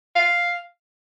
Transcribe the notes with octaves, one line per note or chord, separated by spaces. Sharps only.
F5